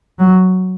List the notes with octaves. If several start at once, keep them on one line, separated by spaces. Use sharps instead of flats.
F#3